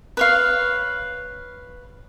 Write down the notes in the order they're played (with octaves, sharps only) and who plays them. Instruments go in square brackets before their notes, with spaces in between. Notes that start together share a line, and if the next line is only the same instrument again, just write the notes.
[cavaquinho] B4 C#5 F5